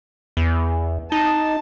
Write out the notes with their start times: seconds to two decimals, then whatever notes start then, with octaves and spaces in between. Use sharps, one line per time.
0.37 E2
1.12 D#4 A5